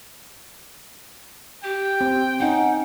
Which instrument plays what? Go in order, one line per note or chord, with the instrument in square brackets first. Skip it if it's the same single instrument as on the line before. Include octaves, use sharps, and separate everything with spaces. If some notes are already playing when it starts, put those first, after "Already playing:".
[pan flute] G4 [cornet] G5
[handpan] C4
[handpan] C#4 D#4 [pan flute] F#5